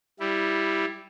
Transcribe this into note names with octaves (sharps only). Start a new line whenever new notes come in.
G3 E4